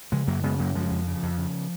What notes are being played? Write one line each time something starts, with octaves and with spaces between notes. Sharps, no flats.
C#3 F3 G#3
F#2 F#3 A#3
C#3 G#3 B3
F#2 F#3 A#3
C#3 F3 G#3
F2
C#3
F2
C#3